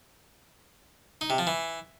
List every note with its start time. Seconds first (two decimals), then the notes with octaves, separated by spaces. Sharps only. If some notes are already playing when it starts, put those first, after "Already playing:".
1.21 D#4
1.30 C3
1.38 F3
1.47 E3